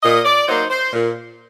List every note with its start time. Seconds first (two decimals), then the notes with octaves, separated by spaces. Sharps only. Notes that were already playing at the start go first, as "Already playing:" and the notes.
0.03 A#2 D#5
0.25 D5
0.48 F#3 A#3 D#4 C5
0.70 C5
0.93 A#2